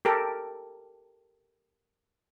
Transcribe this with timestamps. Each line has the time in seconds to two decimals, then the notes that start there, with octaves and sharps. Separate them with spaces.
0.05 G4 A4 A#4